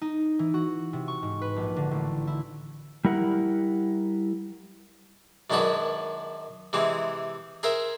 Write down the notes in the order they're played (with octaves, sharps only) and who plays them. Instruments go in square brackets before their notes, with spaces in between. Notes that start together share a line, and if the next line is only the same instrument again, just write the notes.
[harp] D#4
E3
F#4
C3
C#6
G#2
B4
A#1
D3
A1
E4
[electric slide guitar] G3 E4 A#4 F#5
[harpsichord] F#2 D#3 G#3 D4 F#4 B4
C3 E3 G#3 C4
G#4 A#4 C5 E5